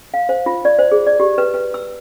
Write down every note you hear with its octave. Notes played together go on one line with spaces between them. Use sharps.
F5
C5
F4
D5
C5
G#4
D5
G4
B4
B4
E6